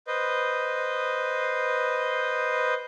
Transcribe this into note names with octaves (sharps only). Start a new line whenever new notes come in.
B4 C5 D#5